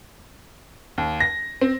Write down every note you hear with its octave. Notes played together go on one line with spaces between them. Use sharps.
D#2
A#6
C4